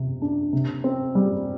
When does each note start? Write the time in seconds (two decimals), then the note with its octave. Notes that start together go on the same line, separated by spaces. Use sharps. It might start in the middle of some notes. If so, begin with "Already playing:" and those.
Already playing: C3
0.22 D4
0.53 C3
0.84 C4
1.15 G3